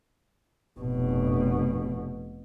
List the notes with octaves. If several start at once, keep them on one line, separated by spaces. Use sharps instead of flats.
F1 B2